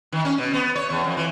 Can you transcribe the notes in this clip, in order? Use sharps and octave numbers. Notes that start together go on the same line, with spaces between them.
D#3
C#4
B2
B3
C#5
E2
F2
E3